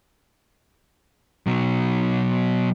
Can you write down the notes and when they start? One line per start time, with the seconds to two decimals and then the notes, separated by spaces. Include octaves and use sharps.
1.47 B2 F#3